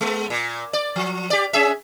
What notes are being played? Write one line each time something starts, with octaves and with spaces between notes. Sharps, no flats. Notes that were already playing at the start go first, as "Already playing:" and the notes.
G#3 B3
A#2
D5
F3
G4 D5
C#4 G#4 E5